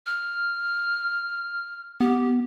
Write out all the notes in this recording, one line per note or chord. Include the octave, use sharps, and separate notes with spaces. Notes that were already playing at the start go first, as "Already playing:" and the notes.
F6
B3 G4